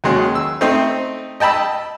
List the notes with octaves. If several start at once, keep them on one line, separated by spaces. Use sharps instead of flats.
D#2 F#3 G#3 C#4
E6
A3 C4 D#4 G5 C6
D#5 G5 A5 B5 E6